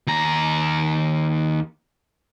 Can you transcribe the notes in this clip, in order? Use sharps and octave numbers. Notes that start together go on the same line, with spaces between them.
D#2 A#5